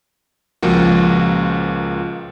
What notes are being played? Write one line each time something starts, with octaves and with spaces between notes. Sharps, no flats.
C#2 A#2 F3 A#3 F#4